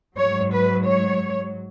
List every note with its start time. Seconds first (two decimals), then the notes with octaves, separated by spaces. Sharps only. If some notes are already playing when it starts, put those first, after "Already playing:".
0.17 G#2 F#3 C#5
0.51 B4
0.85 C#5